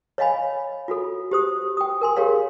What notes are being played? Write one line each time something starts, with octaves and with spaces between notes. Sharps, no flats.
C#5 D#5 F5 G#5 B5
F4 F#4 A4
G4 C5 D#6
G5 D#6
A#4 G#5 C6
G4 G#4 A#4 C#5 F5